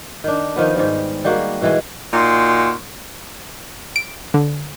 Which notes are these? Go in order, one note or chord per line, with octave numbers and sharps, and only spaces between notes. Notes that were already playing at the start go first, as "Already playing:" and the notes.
D#3 D4
D#3 F3 B3
G#2 D#3 G3
G3 G#3 A#3 F#4
B2 E3 G#3
A#2 D#4 F#4 C6
D7
D3